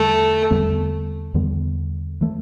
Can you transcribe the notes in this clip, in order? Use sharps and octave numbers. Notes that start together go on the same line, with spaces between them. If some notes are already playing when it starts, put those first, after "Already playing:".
Already playing: E2 D3 G3 A3
E2 D3 G3 B3
E2 D3 G3 B3
E3 A3